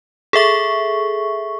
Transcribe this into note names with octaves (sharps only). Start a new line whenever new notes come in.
G#4 A4 E5 C#6